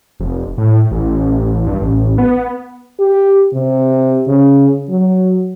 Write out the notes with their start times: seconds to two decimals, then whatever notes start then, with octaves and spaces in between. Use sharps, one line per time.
0.20 F1
0.58 A2
0.91 A1
1.67 G2
1.81 A1
2.18 B3
3.00 G4
3.54 C3
4.27 C#3
4.89 F#3